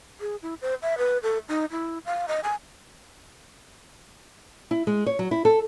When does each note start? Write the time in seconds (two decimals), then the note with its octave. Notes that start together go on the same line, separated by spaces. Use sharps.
0.21 G#4
0.42 E4
0.62 C5
0.83 E5
0.98 B4
1.23 A4
1.49 D#4
1.71 E4
2.06 F5
2.28 D#5
2.44 G#5
4.71 E4
4.87 G#3
5.06 C#5
5.19 F#3
5.31 E4
5.45 A4